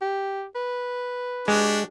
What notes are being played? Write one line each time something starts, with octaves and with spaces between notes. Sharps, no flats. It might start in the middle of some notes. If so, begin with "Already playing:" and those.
G4
B4
G#3 D4 F#4 G4